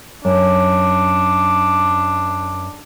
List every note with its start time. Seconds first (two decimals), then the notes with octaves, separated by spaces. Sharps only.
0.25 F#2 D4